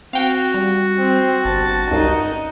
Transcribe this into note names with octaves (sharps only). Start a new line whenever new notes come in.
C4 F#4 F5 G5
G3
C4
G1 A5
C#2 G2 D#4 A#4